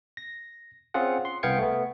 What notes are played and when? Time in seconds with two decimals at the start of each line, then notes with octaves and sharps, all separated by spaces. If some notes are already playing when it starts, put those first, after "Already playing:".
0.17 A#6
0.94 C4 C#4 F4 G#4 F#5
1.25 C6
1.43 C2 B3 F5 G5 G#6 C#7
1.59 A3 B3